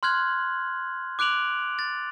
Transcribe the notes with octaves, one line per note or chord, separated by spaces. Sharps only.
C6 F6 F#6 G#6 F#7
D6 F#6 D7 F7 F#7
A6